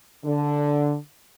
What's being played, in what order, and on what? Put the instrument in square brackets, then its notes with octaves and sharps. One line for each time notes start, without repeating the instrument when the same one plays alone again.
[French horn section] D3